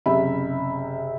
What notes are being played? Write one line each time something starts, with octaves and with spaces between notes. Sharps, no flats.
F#1 C3 E5 B5